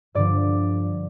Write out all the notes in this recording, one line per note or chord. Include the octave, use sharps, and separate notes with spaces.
G2 D3 F3 D5